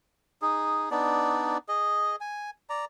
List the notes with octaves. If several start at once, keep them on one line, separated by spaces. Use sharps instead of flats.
D#4 G#4
B3 D4 D#4 D5
G#4 D#5
G#5
D5 A#5